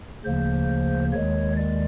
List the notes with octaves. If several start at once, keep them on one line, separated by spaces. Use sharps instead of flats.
D2 C#3 F3 A#3 C5
D#2 D#3 G#3 C#5
D5